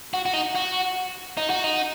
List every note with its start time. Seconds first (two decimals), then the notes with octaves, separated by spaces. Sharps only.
0.14 F#4
0.26 F#4
0.33 D#4
0.55 F#4
1.37 D#4
1.50 F#4
1.64 D#4